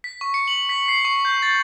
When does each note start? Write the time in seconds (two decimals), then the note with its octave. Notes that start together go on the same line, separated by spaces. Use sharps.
0.04 B6
0.21 C#6
0.34 C#7
0.48 F#7
0.69 B6
0.88 C7
1.05 C#6
1.25 G6
1.42 A6